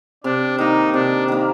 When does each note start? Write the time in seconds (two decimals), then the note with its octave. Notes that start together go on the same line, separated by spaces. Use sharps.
0.24 C3 D4
0.58 D#3 A#3 D#4
0.93 C3 D4
1.28 D#3 A#3